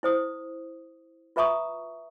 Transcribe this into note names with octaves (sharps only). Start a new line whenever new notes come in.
E4 C5 D#6
F4 B4 E5 A#5 C#6 D#6